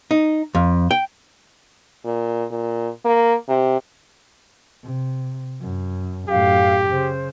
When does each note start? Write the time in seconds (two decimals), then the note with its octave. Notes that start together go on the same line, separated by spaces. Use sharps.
0.11 D#4
0.55 F2
0.91 G5
2.05 A#2
2.51 A#2
3.05 A#3
3.48 C3
4.84 C3
5.61 F#2
6.29 F#2 A2 G4 F5
6.90 C#3 C5